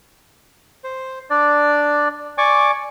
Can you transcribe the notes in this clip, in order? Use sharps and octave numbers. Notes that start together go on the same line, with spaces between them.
C5
D4 D5
D5 G#5 C#6 D6